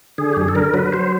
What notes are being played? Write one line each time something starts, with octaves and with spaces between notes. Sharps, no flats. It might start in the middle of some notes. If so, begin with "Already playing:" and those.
D3 G#4
G4
F#2 G#4
A4
D3 A#4
F#3 B4
F#3 C5